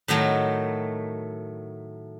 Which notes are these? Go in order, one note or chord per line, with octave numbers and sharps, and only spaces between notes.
A2 D#3 F#3 A3